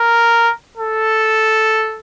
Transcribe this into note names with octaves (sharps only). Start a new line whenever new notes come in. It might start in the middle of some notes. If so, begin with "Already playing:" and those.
Already playing: A#4
A4